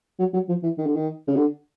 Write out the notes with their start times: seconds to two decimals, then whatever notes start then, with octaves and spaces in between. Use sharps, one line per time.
0.19 F#3
0.34 F#3
0.49 F3
0.63 E3
0.78 D#3
0.86 D3
0.96 D#3
1.28 C#3
1.36 D3